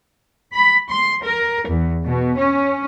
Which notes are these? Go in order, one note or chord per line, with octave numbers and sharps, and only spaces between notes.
B5
C6
A#4
E2
B2
C#4